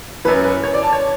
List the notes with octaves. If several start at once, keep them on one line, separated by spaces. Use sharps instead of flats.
F#2 E3 B4
B4
C#5
D5
A5
C#5